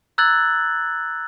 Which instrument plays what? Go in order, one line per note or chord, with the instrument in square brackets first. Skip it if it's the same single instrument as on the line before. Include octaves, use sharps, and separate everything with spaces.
[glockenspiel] A#5 E6 F#6 G#6 A6 F#7